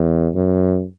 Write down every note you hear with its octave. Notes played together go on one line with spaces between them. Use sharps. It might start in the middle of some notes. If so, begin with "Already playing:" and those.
Already playing: E2
F#2